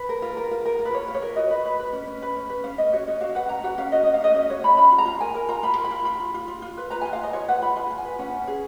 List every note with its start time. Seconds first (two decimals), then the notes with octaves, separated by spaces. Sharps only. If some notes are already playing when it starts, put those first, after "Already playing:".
Already playing: B4
0.09 A#4
0.22 F4
0.37 A#4
0.51 F4
0.66 A#4
0.79 F4
0.85 B4
0.93 F4 C#5
1.08 F4
1.15 C#5
1.22 A#4
1.36 F#4 D#5
1.51 B4
1.65 B4
1.79 B4
1.93 C#4
2.07 C#4
2.22 B4
2.36 C#4
2.50 B4
2.64 C#4 F5
2.78 C#4 D#5
2.93 F#4 C#5
3.07 C#4 D#5
3.21 F#4 F5
3.35 B4 F#5
3.49 C#4 A#5
3.64 F#4 F#5
3.78 C#4 F5
3.92 F#4 D#5
4.04 C#4 D#5
4.14 F5
4.21 C#4 D#5
4.34 C#4 D#5
4.50 F#4 C#5
4.64 C#4 B5
4.77 F4 B5
4.92 F4
4.98 A#5
5.06 F4
5.20 A#4 G#5
5.34 A#4
5.49 F4 A#5
5.63 F4 B5
5.77 A#4
5.85 B5
5.91 F4
6.05 F4 B5
6.20 F4
6.34 F4
6.48 F4
6.62 F4
6.77 B4
6.90 B4 A#5
7.01 F4 G#5
7.13 F5
7.19 F4 D#5
7.33 F4 C#5
7.48 B4 F#5
7.62 F4 B5
7.76 F4 G#5
7.90 F4
7.98 G#5
8.05 B4
8.19 C#4 F#5
8.33 C#4
8.47 G#4